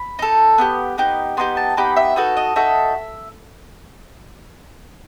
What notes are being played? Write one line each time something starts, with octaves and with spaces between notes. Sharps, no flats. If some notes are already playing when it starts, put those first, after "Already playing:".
Already playing: B5
D#4 A4
B3 D#4 G4
B3 D#4 G4
B3 D#4 G4 C6
A5
B3 D#4 G4 B5
E5
D#4 F#4 A4 B4
D#5
D#4 F#4 A4 E5